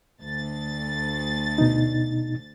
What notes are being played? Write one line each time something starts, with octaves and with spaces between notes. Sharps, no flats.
D2 A6
B2 D#4